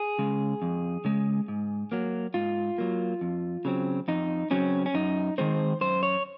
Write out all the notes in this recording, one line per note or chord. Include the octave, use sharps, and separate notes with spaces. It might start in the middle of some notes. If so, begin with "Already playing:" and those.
Already playing: G#4
C#3 G#3
F2
C#3 G#3
G#2
F#3 A#3
G#2 F4
F#3 A#3
F2
C#3 F#3 C4
F2 D#4
C#3 F#3 C4 C#4
C#4
F#2 D#4
D#3 G#3 C4 C5
F#2 C5
C#5